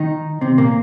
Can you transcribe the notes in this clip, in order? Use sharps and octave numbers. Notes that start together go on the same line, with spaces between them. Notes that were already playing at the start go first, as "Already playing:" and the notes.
Already playing: D#3 D#4
C3 C4
A#2 A#3